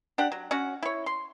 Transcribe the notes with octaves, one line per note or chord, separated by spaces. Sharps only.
D4 G4 F#5
F#3
C#4 F#4 F#5
E4 C#5
C6